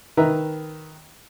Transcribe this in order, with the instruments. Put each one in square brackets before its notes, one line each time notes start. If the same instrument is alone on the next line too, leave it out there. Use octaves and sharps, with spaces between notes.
[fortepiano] D#3 B4 E5 A#5